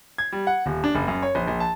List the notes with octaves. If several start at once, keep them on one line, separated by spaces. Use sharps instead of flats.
G#6
G3
F#5
D#1
D4
F#1
F#2
C#5
A#1
A#1
A5